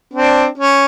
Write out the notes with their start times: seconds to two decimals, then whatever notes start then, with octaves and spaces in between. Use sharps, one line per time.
0.14 C4 D4
0.58 C#4